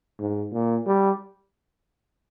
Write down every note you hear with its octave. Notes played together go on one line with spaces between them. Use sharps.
G#2
A#2
G3